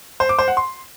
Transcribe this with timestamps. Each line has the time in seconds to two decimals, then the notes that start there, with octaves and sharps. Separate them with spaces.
0.20 C5
0.29 D6
0.39 C5
0.48 F#5
0.57 C6